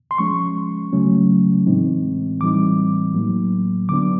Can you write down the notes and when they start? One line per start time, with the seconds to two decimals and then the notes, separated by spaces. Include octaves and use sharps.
0.11 C6
0.18 F3 G#3 C#4 C#6
0.93 C#3 F#3 A3 C#4
1.66 A2 E3 G#3 C4 D#4
2.40 A2 E3 G3 C4 D#4 D6
3.15 A2 F#3 A#3
3.89 D3 F#3 B3 D4 D6